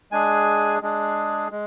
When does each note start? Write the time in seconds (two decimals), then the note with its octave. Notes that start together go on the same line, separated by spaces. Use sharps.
0.12 G#3 D4 G#4 G#5
0.82 G#3 D4 G#4
1.52 G#3